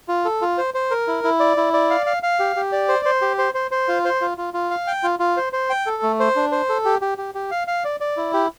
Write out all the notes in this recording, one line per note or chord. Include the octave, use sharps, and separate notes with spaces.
F4
A4
F4
C5
C5
A#4
E4
E4
D5
E4
D5
F5
F5
F5
G4
G4
D5
C5
C5
G4
C5
C5
C5
F4
C5
F4
F4
F4
F5
G5
F4
F4
C5
C5
G5
A4
A3
C5
D4
C5
A4
G4
G4
G4
G4
F5
F5
D5
D5
E4
G4